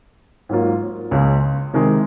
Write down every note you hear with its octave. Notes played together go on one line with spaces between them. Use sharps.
G#2 F#3 A#3 F4
C#2 C#3 G#3
C3 D#3 G#3